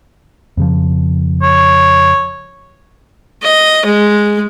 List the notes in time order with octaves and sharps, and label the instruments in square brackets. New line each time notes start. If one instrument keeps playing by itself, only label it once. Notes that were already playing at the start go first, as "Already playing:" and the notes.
[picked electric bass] F2 C#3 F3
[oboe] C#5
[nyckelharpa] D#5
G#3